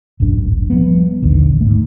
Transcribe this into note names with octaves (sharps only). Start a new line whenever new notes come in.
D1 G#1 F#2 D4
F3 G3 B3
A#1 D#2 D3
G#2 A3